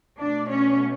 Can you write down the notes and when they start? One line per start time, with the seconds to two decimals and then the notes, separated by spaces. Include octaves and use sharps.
0.19 B2 A3 D4 D5
0.48 C#4 C#5